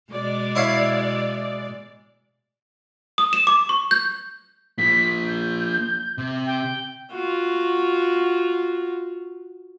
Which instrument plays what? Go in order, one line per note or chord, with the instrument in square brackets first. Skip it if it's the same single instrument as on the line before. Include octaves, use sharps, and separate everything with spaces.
[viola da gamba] B2 G#3 [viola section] D5
[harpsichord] E4 C#5 F5
[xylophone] D#6
E7
D6
C#6
G6
[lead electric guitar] F3 A#3 [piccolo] B6
[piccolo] G6
[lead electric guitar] C3
[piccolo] G5
[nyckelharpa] F4 F#4